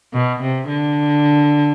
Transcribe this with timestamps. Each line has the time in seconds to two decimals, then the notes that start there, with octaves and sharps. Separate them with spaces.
0.13 B2
0.42 C3
0.69 D3